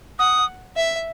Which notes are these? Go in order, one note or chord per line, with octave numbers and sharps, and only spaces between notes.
F#5 D#6
E5